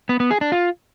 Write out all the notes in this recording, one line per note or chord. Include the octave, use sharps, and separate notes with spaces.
B3
B3
G#4
D4
F4